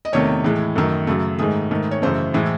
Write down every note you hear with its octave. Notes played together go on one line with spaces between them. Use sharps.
D#5
E2 C3 D#3 A3 C#5
A2 E3 G#3
F#2 D#3 A3
F#2 C#3 F#3 A3
G#2 D#3 A3 G#4
G#2 D#3 A3
C#5
F#2 C#3 E3 A3 C5
A2 E3 G#3